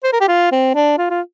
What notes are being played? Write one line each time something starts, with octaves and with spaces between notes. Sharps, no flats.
C5
A#4
G4
F4
C4
D4
F4
F4